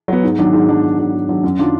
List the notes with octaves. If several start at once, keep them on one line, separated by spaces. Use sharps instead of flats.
F#3 B3
G#2
D#3 F#3 D4
G#2
D#3 F#3 D4
G#2
D#3 F#3 D4
G#2
D#3 F#3 D4
F#2
D#3 F#3 D4 F4